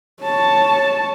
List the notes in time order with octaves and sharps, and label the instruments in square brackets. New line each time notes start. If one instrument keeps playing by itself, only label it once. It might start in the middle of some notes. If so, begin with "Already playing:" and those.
[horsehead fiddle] C#5 A5